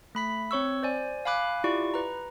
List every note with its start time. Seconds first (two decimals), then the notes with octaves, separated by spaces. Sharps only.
0.15 A3 B5 B6
0.51 C4 C#5 C#6 E6
0.83 C5 D5 G#5
1.25 F5 G#5 B5 D6 F#6
1.64 E4 F4 G4 D5 C#6
1.94 B4 A#5